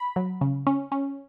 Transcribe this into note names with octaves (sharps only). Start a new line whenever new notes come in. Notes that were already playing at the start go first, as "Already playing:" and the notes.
Already playing: B5
F#3
C#3
C#4
C#4